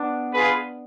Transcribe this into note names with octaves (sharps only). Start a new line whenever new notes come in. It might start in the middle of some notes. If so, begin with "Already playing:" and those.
Already playing: B3 D4
F4 G#4 B4